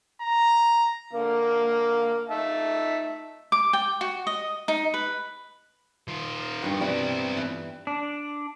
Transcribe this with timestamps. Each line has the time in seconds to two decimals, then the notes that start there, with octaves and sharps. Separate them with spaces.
0.21 A#5
1.13 D3 A#3 F5
2.30 D#4 E5 A5
3.52 D6
3.73 G5
4.01 F#4
4.27 D#5
4.68 D#4
4.94 B4
6.08 D#3 F4
6.62 G2 B3 F#4
6.80 E3 G3 C4 E4
7.37 E3
7.87 D4